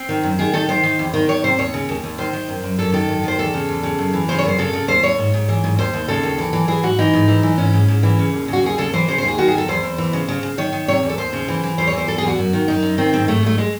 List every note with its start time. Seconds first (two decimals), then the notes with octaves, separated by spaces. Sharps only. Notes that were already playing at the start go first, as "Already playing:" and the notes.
Already playing: C4
0.09 D#3
0.23 F#2
0.39 D#3 G#4
0.53 D#3 A4
0.68 D#3 C5
0.83 D#3
0.99 E2
1.14 D#3
1.29 D#3 C#5
1.44 C3 C5
1.59 D#2 C#5
1.74 C#3
1.89 D#2
2.04 D#2
2.18 D#3 C5
2.33 D#3
2.49 F#2
2.63 F#2
2.79 F#2 A4
2.93 D#3 A4
3.09 F#2
3.24 D#3 C5
3.38 E2 A4
3.54 C#3
3.69 E2
3.83 C#3
3.99 F#2
4.13 E3
4.29 C#3 C5
4.38 C#5
4.43 F#2 C5
4.58 C#3 A4
4.73 C#3
4.88 D#2 C5
5.03 D#2 C#5
5.18 G#2
5.34 G#2
5.49 E3
5.64 G#2
5.79 D#2 C5
5.93 D#2
6.08 C#3 A4
6.23 D#2
6.38 E3
6.53 E3
6.68 E3 G#4
6.83 G#2 F#4
6.99 E3 D#4
7.13 G#2
7.28 E3
7.43 E3
7.58 G#2 C#4
7.73 G#2
7.88 G#2
8.03 E3
8.19 C#3
8.33 D#2
8.48 C#3 F#4
8.63 D#2 G#4
8.78 C#3 A4
8.93 E3 C5
9.08 C#3 C5
9.18 C5
9.23 D#2
9.28 G#4
9.38 D#3 F#4
9.48 G#4
9.53 E2 A4
9.68 E2 C5
9.83 E2
9.98 E3
10.13 C#3
10.28 C#3
10.43 C#3
10.58 D#3 C#5
10.73 D#3
10.88 C3 C#5
11.03 E2
11.09 A4
11.18 D#2 C5
11.33 C#3
11.48 E3
11.63 E3
11.78 E2 C5
11.87 C#5
11.93 E3 C5
12.08 E2 A4
12.18 G#4
12.23 E2 F#4
12.38 F#2
12.53 D#3
12.68 F#2 D#4
12.83 F#2
12.98 D#3 C4
13.13 G#2 C4
13.28 G#2 A3
13.43 G#2 A3
13.58 G#3